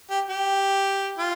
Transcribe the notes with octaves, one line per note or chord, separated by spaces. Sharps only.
G4
G4
F4